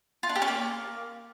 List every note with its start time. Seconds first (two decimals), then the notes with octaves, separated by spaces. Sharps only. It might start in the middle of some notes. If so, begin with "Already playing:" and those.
0.23 F4
0.29 D4
0.36 G4
0.42 C#4
0.48 A#3